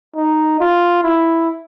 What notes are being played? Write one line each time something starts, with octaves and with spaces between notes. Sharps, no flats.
D#4
F4
E4